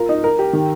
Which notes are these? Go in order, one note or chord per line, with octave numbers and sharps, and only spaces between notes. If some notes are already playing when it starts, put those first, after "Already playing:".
Already playing: F4 A#4
D#4
A#4
G4
D#3